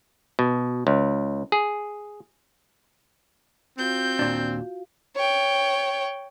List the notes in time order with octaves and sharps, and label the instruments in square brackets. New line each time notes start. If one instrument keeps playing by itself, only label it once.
[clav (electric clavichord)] B2
C#2
G#4
[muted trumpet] C4 [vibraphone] F4 F#4 F5 [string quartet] G6
[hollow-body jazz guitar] D#2 A#2 D4
[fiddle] C#5 G5